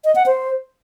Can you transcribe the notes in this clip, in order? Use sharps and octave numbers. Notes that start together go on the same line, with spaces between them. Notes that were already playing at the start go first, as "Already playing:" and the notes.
D#5
F#5
C5